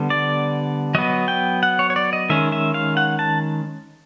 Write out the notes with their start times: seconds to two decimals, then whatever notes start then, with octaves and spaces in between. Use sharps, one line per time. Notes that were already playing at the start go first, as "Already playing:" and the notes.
Already playing: D3 G3 B3
0.10 D5
0.95 F#3 B3 D#5
1.28 G5
1.63 F#5
1.79 C#5
1.90 C#5
1.96 D5
2.13 D#5
2.30 D#3 G#3 C#4 E5
2.52 E5
2.74 F5
2.97 F#5
3.19 A5